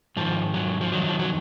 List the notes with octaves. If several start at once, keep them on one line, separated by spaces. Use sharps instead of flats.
G#2 D#3 F3
F#3
F3
F2 D#3 F#3
F3
F#3